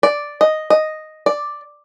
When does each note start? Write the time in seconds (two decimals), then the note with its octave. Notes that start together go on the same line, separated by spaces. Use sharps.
0.03 D5
0.41 D#5
0.70 D#5
1.26 D5